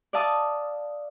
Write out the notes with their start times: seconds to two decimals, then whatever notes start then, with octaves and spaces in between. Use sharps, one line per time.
0.13 D5 E5 F5 A5 D#6